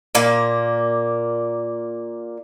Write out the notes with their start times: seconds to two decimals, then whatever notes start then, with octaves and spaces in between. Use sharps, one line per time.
0.15 A#2 A#3